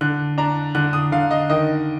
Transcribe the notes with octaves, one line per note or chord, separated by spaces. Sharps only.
D3 F#6
D4 A#5
D3 F#6
D#6
D3 F5
D#5
D#3 D#5